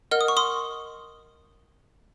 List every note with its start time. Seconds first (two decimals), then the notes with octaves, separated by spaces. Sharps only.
0.11 A#4 D#5 F#5 F6
0.21 D#6
0.28 C#6
0.37 C6 D#6